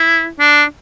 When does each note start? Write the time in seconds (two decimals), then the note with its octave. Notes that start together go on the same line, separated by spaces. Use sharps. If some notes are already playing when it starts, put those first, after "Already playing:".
Already playing: E4
0.40 D4